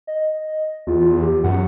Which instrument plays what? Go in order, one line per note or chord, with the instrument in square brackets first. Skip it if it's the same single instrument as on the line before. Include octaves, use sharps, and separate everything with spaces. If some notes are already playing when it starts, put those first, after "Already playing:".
[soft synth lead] D#5
[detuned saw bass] E2 [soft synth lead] F4
[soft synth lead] G4
[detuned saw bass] F#2 [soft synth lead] F#5